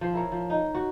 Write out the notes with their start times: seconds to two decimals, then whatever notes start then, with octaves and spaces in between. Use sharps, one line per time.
0.01 F3 C5
0.14 E4 A#4 C#5
0.32 F3
0.50 D#4
0.75 F#4